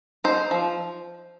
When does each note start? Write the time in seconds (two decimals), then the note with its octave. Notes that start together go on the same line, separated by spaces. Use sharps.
0.24 D#4 C5
0.51 F3